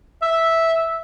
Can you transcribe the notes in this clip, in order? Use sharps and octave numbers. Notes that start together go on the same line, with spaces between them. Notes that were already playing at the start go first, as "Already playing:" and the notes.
E5